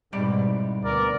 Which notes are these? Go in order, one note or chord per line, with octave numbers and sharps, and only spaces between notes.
C2 G#2 B2 G3 D5
D2 B3 A#4 D5